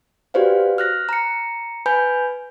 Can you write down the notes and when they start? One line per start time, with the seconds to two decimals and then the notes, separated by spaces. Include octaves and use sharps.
0.34 F#4 G4 B4 C5 D5 F5
0.78 F6 F#6 A#6
1.09 A#5 C#7
1.86 B4 G#5 B5 G6